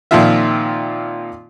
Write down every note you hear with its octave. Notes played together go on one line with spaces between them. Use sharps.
A#2 D#3 F3 C4 F4 E5